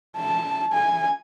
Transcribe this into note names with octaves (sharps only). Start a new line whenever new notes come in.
A5
G#5